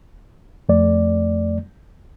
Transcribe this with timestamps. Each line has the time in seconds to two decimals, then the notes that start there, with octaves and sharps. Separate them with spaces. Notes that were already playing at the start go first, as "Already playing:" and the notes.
0.69 F2 A3 D5